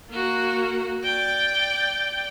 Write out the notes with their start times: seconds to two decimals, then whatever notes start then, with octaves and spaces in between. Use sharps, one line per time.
0.11 A#3 F#4
1.04 D5 G5